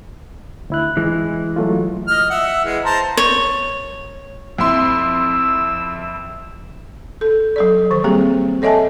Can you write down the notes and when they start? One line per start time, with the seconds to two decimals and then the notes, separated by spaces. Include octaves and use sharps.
0.70 D2 E4 F#6
0.97 E3 G#3
1.56 F#3 A3 F4
2.07 D#5 F6
2.30 E5 F#5
2.64 E3 G#3
2.85 C5 A5 A#5
3.17 C#5
4.59 F2 E4 C6 E6
7.21 A4
7.56 F#3 A4 D5
7.91 D#3 F3 C5
8.04 G3 A#3 C4 G4 G#4
8.62 A4 C#5 D#5 E5 G#5 A5